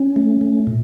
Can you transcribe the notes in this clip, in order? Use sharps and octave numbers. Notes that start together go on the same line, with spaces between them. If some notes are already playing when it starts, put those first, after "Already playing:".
Already playing: C#4
A3
A3
A#2